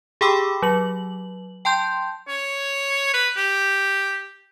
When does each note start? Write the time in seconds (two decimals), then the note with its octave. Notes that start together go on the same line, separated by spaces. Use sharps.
0.21 G4 G#4 G5 B5 D6 E6
0.62 F#3 F#7
1.65 G5 A5 C6 G6
2.28 C#5
3.14 B4
3.37 G4